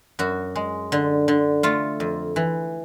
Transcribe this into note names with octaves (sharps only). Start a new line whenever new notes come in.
F#2 F#4
G#3
D3
D3
A3 F4
F2
E3